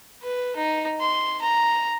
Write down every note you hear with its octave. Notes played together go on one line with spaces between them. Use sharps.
B4
D#4
C6
A#5